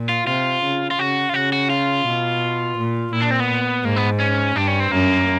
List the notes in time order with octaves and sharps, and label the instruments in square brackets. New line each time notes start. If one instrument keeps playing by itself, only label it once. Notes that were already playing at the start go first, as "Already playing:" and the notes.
Already playing: [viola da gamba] A#2
[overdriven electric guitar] F4
[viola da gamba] C3 [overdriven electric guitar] F4
[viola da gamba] C#3
[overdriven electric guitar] F4
[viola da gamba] C#3 [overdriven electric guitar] F#4
[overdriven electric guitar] F4
[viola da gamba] C#3 [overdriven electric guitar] F#4
[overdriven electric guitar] F#4
F4
[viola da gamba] B2
A#2
[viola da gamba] A#2 [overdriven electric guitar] E4
[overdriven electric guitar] D4
C4
B3
[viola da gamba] G#2 [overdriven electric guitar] A#3
[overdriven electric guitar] B3
C#4
[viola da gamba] G2 [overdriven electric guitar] D4
[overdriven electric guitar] C#4
C4
[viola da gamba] F#2 [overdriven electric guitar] A#3